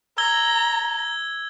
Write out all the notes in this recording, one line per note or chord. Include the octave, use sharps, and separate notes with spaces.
A#5 E6 G#6 G7